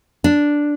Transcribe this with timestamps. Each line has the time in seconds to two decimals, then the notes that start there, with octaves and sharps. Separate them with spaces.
0.24 D4